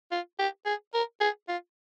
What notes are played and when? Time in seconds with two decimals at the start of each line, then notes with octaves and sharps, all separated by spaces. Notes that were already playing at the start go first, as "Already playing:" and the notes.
0.12 F4
0.39 G4
0.66 G#4
0.94 A#4
1.21 G#4
1.48 F4